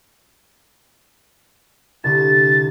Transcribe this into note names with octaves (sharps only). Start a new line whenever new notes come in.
C2 D3 A6